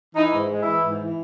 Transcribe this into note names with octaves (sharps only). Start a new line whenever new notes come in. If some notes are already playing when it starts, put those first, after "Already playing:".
E3 D#4
G#2
G#3
E3 E4
G#2
E3